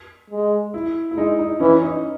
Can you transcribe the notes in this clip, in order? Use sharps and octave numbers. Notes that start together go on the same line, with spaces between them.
G#3
E4
E4
G#3 D#4
D#4
E3 C#4
D#4